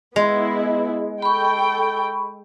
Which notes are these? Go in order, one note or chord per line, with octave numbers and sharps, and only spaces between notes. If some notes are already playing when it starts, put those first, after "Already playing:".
G#3 B3 E4
A4 G5 B5 C#6